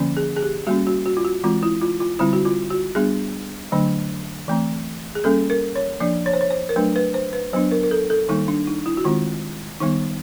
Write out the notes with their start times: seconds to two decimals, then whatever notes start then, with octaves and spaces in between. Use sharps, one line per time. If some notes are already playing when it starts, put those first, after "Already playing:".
Already playing: D3 F3 A#3 C#4
0.17 G#4
0.36 G#4
0.43 G4
0.67 G3 A#3 C#4 F#4
0.87 F#4
1.06 F#4
1.17 F4
1.25 F#4
1.44 E3 G#3 C4 F4
1.63 E4
1.81 F4
2.00 F4
2.19 D3 G3 C4 E4
2.33 F#4
2.45 F4
2.71 F#4
2.95 G3 B3 D4 G#4
3.72 D3 F#3 A3 D4
4.48 E3 A3 C4
5.15 G#4
5.24 G3 A#3 C#4 A4
5.50 A#4
5.76 C#5
6.00 F3 A#3 D4 D5
6.26 C#5
6.33 C5
6.41 C#5
6.50 C5
6.69 A#4
6.76 F#3 A3 D4 B4
6.96 B4
7.14 C5
7.33 B4
7.53 F#3 B3 D4 C5
7.72 A#4
7.83 A#4
7.91 A4
8.10 A4
8.29 D#3 G3 A#3 D#4
8.48 D4
8.67 D#4
8.86 E4
8.97 F#4
9.04 D#3 G#3 C4 F4
9.80 D#3 G3 B3 D#4